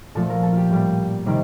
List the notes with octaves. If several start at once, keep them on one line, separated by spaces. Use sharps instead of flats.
A#2 F3 A3 A4
A#4
A4
F4 G4
A2 G3 A#3
C3 D#3 G3 A#3